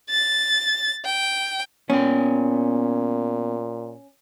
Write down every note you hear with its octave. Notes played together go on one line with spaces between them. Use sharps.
A6
G5
A#2 B3 C#4 G5